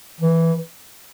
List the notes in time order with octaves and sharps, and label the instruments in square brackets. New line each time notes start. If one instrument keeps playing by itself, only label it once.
[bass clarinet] E3